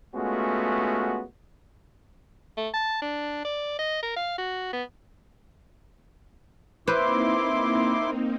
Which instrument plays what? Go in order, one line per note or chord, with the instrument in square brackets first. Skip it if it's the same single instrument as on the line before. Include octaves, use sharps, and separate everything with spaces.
[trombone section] G#3 A3 B3 C#4 F4 F#4
[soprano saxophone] A3
A5
D4
D5
D#5
A#4
F5
F#4
B3
[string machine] A#3 C4 D#4 [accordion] E4 C6 D6 [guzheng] B4 C5